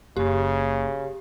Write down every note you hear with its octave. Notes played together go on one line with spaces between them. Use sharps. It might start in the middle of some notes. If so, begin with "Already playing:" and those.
F#1 C#3 G4